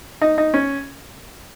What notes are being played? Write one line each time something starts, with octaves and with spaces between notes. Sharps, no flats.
D#4
D#4
C#4